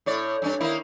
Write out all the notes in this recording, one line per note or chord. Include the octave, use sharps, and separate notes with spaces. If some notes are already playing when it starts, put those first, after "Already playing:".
A2 C#5 D5
G2 C#4 D4
D#3 A#3 E4